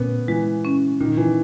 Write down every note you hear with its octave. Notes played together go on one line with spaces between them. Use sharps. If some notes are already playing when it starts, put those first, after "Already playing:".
Already playing: A#2 B3 C#4
E3 G#3
C#4
A#2 D#3
E3